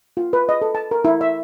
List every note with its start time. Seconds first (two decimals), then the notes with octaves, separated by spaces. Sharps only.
0.17 F4
0.33 B4
0.49 D#5
0.62 A4
0.75 A5
0.91 A#4
1.05 E4
1.21 E5